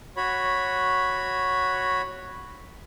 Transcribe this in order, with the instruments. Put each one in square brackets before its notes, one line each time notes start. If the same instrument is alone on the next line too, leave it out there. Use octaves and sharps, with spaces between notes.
[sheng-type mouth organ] F#4 C#5 B5